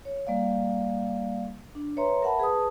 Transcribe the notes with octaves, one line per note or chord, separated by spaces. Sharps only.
C#5
G3 A#3 D5 F5
D4
B4 C#5 E5 A#5 C6
A#4 E5 F#5 A5 B5
G#4 B4 A5 D#6